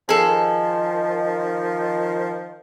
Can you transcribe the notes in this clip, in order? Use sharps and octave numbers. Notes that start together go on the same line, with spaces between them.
D#3 F3 G#4 A4